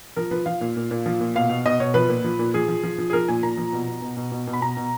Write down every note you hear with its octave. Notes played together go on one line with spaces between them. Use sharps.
F3 A#4
F3 B4
F3 F5
A#2
A#2
A#2
F3
A#2
B2 F5
B2
B2 D#5
B2 C#5
F3 B4
A#2
F3
A#2
F3 G#4
F3
F3
F3
G#4
F3 A#4
A#2 G#5
A#2 A#5
F3
B2
B2
B2
B2
B2
B2
B5
B2 A#5
B2